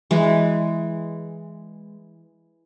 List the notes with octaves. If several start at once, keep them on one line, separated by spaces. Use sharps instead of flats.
E3 G#3